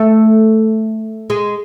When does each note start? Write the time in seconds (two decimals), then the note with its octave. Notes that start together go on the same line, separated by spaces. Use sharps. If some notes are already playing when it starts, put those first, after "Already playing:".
Already playing: A3
1.30 G#3